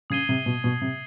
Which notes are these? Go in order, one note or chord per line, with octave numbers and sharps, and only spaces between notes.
C#3 D#6 G#6 C7 D#7 G7
C3
B2
B2
C3